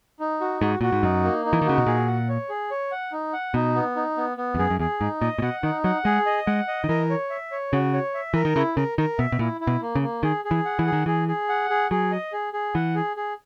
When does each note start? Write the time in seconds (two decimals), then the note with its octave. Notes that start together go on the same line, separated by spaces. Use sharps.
0.20 D#4
0.41 F#4
0.61 G#2 F#4
0.81 A#2 F#4
0.92 G#2
1.03 F#2 D#4
1.24 A#3
1.45 D#4
1.53 E3
1.62 D#3
1.66 C#3 F#4
1.78 B2
1.86 A#2 G#4
2.07 F#5
2.29 C#5
2.49 G#4
2.71 C#5
2.91 F#5
3.12 D#4
3.33 F#5
3.54 B2 D#4
3.75 B3
3.96 D#4
4.17 B3
4.37 B3
4.55 E2
4.59 F#2 G#4
4.70 F#2
4.79 E2 G#4
5.00 G#2 D#4
5.21 A#2 D#5
5.38 A#2
5.42 B2 F#5
5.63 D#3 D#4
5.84 F#3 F#5
6.05 G#3 G#4
6.26 D#5
6.47 G#3 F#5
6.68 D#5
6.84 D#3
6.89 E3 A#4
7.10 C#5
7.30 E5
7.51 C#5
7.73 C#3 F#4
7.94 C#5
8.14 E5
8.34 E3 A#4
8.45 D#3
8.55 C#3 E4
8.77 C#3 A#4
8.98 D#3 A#4
9.18 B2 E5
9.32 B2
9.39 A#2 E4
9.61 E4
9.67 B2
9.82 A#3
9.95 C#3
10.02 A#3
10.23 D#3 G#4
10.45 G#4
10.51 E3
10.65 F#5
10.79 E3
10.87 G#4
10.93 D#3
11.06 E3 G#4
11.28 G#4
11.49 F#5
11.70 G#4
11.91 F#3 G#4
12.12 D#5
12.33 G#4
12.53 G#4
12.74 E3 F#5
12.95 G#4
13.16 G#4